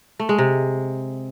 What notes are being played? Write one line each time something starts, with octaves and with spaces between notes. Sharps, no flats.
A3
G#3
C3